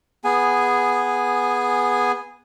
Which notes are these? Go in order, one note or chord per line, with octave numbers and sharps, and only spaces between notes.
B3 G#4 G#5